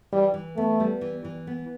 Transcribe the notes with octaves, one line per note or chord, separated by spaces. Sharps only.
E3 G3
E3
A3 B3
G3
E3
E3
B3